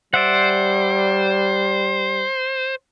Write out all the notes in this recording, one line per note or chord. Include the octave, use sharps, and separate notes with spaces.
G3 C5 D5 E5 F#5